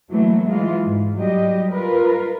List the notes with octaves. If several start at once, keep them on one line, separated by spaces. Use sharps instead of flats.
E3 F#3 A3 A#3
E3 G#3 F4
G#2
F#3 G3 G4 D#5
F4 A#4 B4